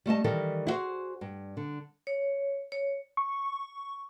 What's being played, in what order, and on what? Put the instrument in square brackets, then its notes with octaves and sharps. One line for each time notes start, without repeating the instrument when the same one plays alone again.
[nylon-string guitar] G3 A3 D#5 A5
D#3 E3 G3 E4 A4 A#4
E4 F#4 G#4 C5
G2
D3
[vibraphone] C#5
C#5
[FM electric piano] C#6